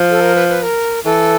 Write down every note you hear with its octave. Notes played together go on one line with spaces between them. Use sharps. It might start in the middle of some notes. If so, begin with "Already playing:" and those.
Already playing: F3
A4
A#4
B4
B4
A#4
E3 A4